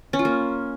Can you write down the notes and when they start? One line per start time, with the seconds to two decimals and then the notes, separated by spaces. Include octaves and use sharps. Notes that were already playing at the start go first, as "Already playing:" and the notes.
0.13 C#4
0.19 F4
0.25 A#3